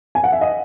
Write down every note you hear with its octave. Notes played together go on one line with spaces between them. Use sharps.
G#5
F#5
E5
D#5